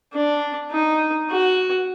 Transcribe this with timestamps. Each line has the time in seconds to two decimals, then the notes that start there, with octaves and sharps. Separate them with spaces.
0.13 D4
0.71 D#4
1.31 F#4